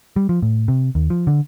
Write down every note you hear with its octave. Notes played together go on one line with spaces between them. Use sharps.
G3
F3
A2
C3
D#2
F3
D3